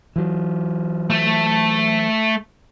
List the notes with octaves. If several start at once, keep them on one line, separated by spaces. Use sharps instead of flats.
E3 F#3
A3